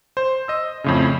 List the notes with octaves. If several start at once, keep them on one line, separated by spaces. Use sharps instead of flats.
C5
D#5 E6
F2 A2 C#3